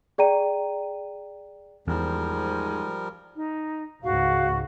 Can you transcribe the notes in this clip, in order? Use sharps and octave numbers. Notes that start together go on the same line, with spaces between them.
G#4 D5 G5 A#5 D#7
E2 G#2 F3 G3 A#4
D#4
C#2 G#2 F#4 F5